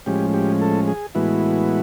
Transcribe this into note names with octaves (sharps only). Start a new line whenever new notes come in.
A2 F3 G#3 C#4 G4
G4
A4
G#4
A2 E3 G#3 B3 E4 F#4